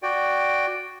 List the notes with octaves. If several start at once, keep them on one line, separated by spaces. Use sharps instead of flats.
F#4 D5 G5